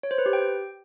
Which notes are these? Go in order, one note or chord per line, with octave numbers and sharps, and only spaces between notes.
C#5
C5
B4
G4
G5